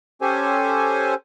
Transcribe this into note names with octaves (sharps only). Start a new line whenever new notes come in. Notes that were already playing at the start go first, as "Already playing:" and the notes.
C#4 G4 A4 C5 G#5